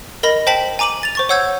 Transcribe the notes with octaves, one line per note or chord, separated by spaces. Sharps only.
A#4 D#5 B5 A#6
C5 G5 A5 B6 F#7
G#5 A#5 D6 D#7 F#7
A6 F7
C5 C#6 A6
C#5 F#5 E6 G6 G#6